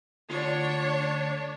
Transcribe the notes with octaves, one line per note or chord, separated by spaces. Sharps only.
D2 D4 F4 C#5 C6